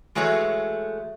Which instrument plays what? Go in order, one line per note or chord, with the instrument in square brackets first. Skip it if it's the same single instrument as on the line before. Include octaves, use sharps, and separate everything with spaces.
[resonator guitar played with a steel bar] E3 G#3 A3 F#4 C#5